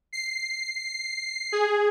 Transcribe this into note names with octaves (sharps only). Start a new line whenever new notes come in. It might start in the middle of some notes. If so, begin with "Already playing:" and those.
C7
G#4